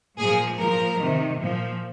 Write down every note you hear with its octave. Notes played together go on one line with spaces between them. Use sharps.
A#2 F3 G#4
A#2 F3 A#4
C3 D#3
A#2 F3